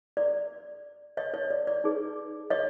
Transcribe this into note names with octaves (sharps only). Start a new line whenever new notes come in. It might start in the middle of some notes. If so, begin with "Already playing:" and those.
D5
C#5 D#5
C#5
D5
D5
D#4 G#4 B4
C#5 D#5